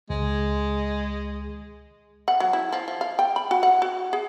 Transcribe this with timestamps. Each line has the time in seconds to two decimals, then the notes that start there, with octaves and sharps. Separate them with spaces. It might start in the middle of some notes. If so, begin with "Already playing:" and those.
0.10 C#2 G#3
2.28 F#5
2.40 F#3
2.53 E4
2.73 F3
2.88 F3
3.01 F5
3.19 G5
3.36 B5
3.51 F#4
3.63 F#5
3.82 F#4
4.13 G#4